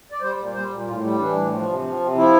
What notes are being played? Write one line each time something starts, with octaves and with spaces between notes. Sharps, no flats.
D5
G3 C5
A#2
G3 C5
A#2
A2 F4
G3
E3 D4
A2
F3
C3
F3
C3
F3 E4